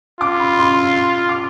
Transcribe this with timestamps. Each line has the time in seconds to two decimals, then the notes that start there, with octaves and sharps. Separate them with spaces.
0.21 F4 D6
0.40 B5
0.59 C6
1.29 D6